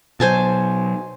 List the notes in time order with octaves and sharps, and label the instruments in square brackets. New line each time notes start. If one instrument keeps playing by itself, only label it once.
[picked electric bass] B2 F#3 [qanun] C5 G#5 A5